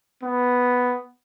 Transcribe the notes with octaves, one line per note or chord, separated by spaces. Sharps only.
B3